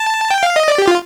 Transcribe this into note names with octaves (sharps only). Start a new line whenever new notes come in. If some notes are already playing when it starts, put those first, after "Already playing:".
Already playing: A5
G5
F5
D#5
D5
G4
F4